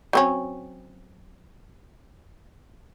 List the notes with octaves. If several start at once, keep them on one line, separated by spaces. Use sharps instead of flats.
F#3 C4 C#4